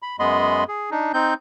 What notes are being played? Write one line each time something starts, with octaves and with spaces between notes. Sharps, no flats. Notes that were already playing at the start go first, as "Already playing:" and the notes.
B5
F#2 G#3 B3 D#5 B5 C6
G#4
D4 D#4
C4 D#4 G6